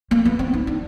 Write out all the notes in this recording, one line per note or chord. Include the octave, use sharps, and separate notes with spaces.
A#3
B3
C4
D#4
D4